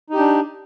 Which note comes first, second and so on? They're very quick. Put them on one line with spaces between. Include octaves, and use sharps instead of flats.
D#4 G4 D4